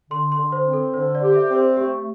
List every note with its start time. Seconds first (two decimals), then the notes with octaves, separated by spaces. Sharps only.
0.11 D3 C6
0.32 C6
0.38 D3
0.52 C5
0.66 C4
0.73 A4
0.94 D3 C5
1.15 D5
1.22 G4
1.36 E5
1.50 C4
1.56 C5
1.77 A3 G4